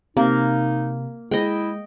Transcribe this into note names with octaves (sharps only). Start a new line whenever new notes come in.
C3 A#3 D#4
G#3 E4 D#5 G5